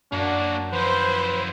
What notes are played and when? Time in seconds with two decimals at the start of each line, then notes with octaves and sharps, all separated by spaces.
0.12 F#2 A#3 D4 F#4
0.73 F3 E4 B4 C5